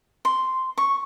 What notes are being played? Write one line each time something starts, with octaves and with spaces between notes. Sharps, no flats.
C6
C#6